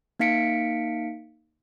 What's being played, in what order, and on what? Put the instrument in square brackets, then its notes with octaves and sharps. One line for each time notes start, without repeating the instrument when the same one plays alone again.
[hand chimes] A#3 D#4 F5 B6 C#7 D7